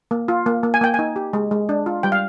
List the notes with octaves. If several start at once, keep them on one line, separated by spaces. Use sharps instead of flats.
A#3
F4
A#3
A#3
G#5
A#3 G5
D#4 G#5
G4
G#3
G#3
D4
F4
G3 G5
F5